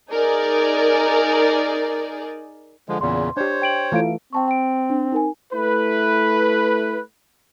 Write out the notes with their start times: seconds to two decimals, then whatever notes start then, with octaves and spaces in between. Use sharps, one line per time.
0.11 D#4 G#4 A#4 D5
2.89 D3 F3 G#3
3.01 E2 A#2 C#3 C6
3.37 D4 G4 C5 C#5
3.62 G5 D7 F#7
3.92 E3 A3 F4 F5 D7
4.33 C4 G5 A5 C#6
4.48 G5 D7
4.90 D4
5.12 D#4 A#4 G#5
5.53 A3 E4 B4